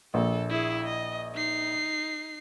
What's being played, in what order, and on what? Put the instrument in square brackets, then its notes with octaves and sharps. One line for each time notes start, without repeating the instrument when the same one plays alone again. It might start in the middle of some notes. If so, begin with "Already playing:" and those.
[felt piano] A#1 [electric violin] A4
[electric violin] E4 G#4
D#5
D#4 C7